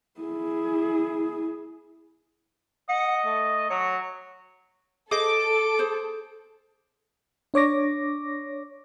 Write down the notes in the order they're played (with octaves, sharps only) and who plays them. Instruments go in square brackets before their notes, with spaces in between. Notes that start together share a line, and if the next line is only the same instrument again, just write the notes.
[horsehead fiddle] E4 G#4
[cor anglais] D#5 [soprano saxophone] F#5
[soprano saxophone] A3
[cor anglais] F#3 [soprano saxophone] C#5
[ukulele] G#4 C5 D#5 [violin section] A4 [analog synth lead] D6
[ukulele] G#4 C5
[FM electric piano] D4 C#5 D6 A#6